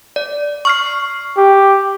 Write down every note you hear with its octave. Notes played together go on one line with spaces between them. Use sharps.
D5
C#6 F6 C7
G4